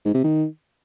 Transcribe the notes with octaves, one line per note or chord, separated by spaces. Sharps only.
G#2
C3
D#3